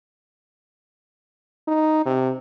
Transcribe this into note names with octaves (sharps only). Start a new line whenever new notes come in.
D#4
C3